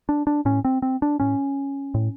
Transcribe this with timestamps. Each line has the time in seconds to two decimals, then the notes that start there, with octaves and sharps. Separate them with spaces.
0.09 D4
0.27 D4
0.45 A2 C#4
0.65 C4
0.82 C4
1.02 D4
1.20 A2 C#4
1.94 A2